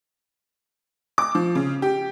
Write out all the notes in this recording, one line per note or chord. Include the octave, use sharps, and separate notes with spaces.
D6
F3
C#3
G4